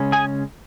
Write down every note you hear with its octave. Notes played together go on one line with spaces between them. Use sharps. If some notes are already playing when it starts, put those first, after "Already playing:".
Already playing: C#3 G#3 C#4
G#4 G#5